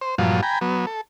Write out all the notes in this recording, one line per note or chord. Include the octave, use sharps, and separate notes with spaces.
C5
G2 A#2 F3 F#3 F4
G5 G#5 A#5 B5
F#3 B3
A4